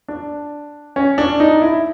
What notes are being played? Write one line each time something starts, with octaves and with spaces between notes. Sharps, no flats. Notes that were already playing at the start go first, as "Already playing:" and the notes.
D4
C#4
D4
D#4
E4